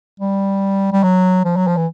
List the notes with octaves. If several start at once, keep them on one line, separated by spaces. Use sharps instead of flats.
G3
G3
F#3
F3
F#3
F3
E3